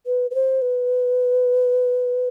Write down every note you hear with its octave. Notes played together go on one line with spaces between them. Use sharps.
B4
B4
C5
B4